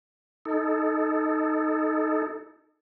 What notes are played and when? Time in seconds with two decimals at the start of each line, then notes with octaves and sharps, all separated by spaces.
0.45 D#4 A4